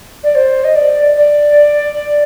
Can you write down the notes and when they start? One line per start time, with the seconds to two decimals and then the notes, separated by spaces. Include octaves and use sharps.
0.24 D5
0.35 C5
0.64 D#5
0.75 D5
1.17 D5